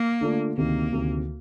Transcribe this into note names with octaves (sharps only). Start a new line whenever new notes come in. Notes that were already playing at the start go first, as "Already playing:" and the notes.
Already playing: A#3
D3 A3 D4 F4
D2 C3 D#3 A#3
D2 C3 D#3